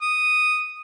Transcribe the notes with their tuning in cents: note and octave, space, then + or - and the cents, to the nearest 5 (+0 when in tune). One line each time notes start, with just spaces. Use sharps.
D#6 -5